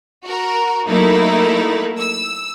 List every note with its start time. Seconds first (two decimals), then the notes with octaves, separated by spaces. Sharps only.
0.24 F#4 A#4
0.87 F#3 A3 A#3 D#4 E4
1.98 E6